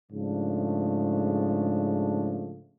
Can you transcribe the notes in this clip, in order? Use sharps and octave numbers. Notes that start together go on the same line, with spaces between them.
G#2 C#3 F3 A3 D4